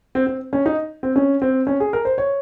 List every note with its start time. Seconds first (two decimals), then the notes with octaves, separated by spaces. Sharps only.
0.15 C4
0.27 C4
0.53 C#4
0.66 D#4
1.03 C4
1.16 C#4
1.42 C4
1.67 C#4
1.80 G#4
1.93 A#4
2.05 C5
2.18 C#5